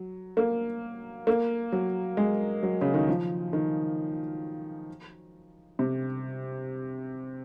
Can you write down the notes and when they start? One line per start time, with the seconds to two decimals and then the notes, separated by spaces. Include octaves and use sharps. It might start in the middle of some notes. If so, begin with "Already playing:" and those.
Already playing: F#3
0.37 A#3
1.27 A#3
1.72 F#3
2.17 G#3
2.63 F#3
2.81 C#3
2.94 D#3
3.08 F3
3.53 D#3
5.79 C3